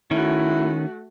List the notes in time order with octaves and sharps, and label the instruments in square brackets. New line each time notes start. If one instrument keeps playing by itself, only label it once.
[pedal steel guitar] D#3 C#4 [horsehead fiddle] A3 F#4 [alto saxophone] E4